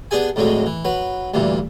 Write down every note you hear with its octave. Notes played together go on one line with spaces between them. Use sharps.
B3 D4 G4 G#4 G#5
F2 A2 D3 F#3 G#3
E3
F#3 B4
D2 G2 A#2 E3